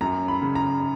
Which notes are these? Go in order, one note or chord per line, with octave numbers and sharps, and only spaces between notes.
F#2 A#5
B5
C#3
A#5